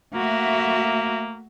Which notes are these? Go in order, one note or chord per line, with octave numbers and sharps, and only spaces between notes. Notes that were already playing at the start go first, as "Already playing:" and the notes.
A3 A#3 F#4 E5